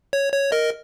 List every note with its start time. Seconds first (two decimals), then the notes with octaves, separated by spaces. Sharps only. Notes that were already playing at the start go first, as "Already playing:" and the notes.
0.13 C#5
0.33 C#5
0.52 A#4 D#5